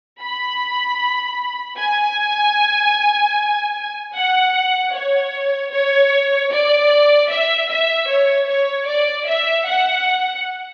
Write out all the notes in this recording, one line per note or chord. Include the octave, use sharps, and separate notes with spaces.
B5
G#5
F#5
C#5
C#5
D5
E5
E5
C#5
C#5
D5
E5
F#5